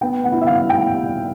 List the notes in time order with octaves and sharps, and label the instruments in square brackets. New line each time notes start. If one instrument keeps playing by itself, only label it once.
[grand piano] B3 [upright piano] G5
[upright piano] F#5
[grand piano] E4
[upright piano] E5
F5
[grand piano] G3
[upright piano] G5
[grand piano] G3